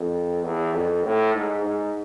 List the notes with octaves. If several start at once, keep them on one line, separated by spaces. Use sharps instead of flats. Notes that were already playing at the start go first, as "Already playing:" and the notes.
Already playing: F2
E2
F2
A2
G#2
G#2